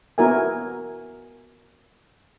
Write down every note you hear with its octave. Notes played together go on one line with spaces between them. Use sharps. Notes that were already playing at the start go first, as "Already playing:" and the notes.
B3 E4 F#4 A#4 E5 G#5